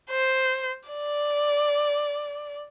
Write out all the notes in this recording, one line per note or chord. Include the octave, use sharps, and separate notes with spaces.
C5
D5